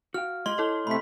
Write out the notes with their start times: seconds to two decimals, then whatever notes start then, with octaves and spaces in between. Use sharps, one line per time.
0.14 F#4 F5 G5 F6
0.46 G#3 F4 G4 D#5 C6 G7
0.58 E4 A4 C#5 D#5
0.87 C3 A3 B5 B6